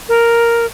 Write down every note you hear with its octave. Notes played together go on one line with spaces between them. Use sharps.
A#4